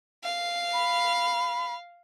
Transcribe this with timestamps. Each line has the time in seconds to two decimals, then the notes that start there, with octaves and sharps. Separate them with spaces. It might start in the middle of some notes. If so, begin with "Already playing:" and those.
0.24 F5
0.73 B5